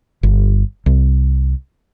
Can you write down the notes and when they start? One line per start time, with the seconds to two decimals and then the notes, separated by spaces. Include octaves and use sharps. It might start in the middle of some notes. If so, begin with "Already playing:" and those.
0.23 G1
0.86 C2